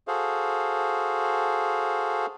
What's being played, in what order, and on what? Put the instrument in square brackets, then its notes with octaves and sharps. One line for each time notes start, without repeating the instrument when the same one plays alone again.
[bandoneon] F#4 G#4 A4 C5 F5